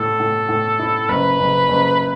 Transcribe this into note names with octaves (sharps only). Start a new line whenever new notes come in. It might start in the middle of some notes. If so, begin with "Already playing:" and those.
Already playing: A2 E4 A4
A2
A2
E4
F#1 B4
F#1
F#1